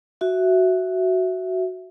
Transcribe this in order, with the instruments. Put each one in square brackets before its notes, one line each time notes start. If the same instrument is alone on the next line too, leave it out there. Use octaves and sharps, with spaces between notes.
[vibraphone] F#4 E5